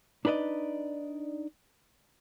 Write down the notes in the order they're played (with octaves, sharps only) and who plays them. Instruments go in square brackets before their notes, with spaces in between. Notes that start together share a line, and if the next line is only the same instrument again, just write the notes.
[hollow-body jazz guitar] D4 D#4 B4 D5 D#5